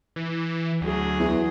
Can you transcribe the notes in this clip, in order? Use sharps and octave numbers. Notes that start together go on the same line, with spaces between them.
E3
D2 F#3 G#4
E2